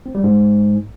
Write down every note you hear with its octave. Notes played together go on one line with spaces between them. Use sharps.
C4
G3
G#2